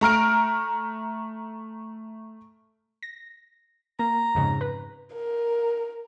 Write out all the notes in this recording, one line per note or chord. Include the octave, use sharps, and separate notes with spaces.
A3 A#5 F6 D7
A#6
A#3 A#5
F2 G#2 C#3
B4
A#4